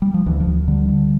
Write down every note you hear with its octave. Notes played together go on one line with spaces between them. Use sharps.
G3
F3
D2 E3
F3
D2
D3 G3
D3